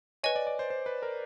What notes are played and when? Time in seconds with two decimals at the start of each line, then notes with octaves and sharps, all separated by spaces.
0.23 B4 C#5 D#5 G#5
0.36 D5
0.47 D5
0.59 C5
0.70 C5
0.86 B4
1.02 A#4